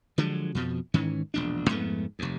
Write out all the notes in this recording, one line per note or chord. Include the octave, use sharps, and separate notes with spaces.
D3 F3 F#3 G#3
F2 B2 F3
G#2 D#3 E3 C#4
E1 A#1 D4
F2 G#2 A3 B3
F1 D#2